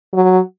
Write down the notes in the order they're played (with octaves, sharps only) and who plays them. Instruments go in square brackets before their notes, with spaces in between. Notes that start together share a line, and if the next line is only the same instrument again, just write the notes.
[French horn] F#3